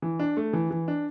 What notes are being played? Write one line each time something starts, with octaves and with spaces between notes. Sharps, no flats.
E3
D4
A3
E3
E3
D4